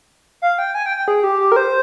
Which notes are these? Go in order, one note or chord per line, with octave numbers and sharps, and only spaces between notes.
F5
G5
G#5
G5
G5
G#4
G4
G4
A#4
C5